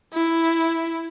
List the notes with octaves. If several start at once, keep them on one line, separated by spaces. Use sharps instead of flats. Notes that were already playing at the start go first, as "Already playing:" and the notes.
E4